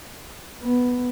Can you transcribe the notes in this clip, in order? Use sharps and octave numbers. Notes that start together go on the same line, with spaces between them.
B3